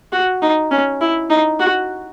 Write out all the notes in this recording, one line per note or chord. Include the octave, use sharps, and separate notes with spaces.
F#4
D#4
C#4
E4
D#4
F#4